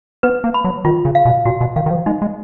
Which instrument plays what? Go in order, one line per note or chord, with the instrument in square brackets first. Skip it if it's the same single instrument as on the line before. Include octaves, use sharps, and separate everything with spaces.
[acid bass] B3 [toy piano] B4
[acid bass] A#3
[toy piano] B5
[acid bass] F#3
[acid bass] D#3 [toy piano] F4
[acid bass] C#3
[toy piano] F5
[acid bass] B2
[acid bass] A#2 [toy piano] F#4
[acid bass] B2
[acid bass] D#3 [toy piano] F5
[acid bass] D#3
F3
[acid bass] G#3 [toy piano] D#4
[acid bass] G#3